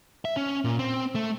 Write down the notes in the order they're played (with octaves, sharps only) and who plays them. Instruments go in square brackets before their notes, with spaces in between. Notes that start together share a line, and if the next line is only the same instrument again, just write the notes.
[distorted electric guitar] E5
C#4
A#2
C4
A3